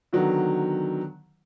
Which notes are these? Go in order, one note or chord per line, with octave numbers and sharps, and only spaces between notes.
D3 D#3 F#3 B3